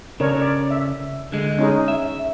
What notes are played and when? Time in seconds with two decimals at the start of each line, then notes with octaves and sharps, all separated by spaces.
0.20 C#3 D4 A#4 C#5
0.41 D5
0.71 E5
1.32 D3 G#3
1.59 C#4 D#4 G#4
1.88 E5